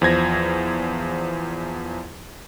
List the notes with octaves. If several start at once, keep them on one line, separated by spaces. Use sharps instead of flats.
E2 F3 C5 G#6 A#6